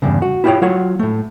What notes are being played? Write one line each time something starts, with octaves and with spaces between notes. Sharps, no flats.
E2 G2 C#3
F#4
E4 F4 G4 G#4 C#5 G5
F#3 F4 C#5 F#5
A2 A3